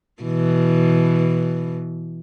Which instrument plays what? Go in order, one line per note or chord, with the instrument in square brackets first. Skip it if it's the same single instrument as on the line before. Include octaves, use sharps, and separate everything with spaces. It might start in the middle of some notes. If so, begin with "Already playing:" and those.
[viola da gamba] B2 E3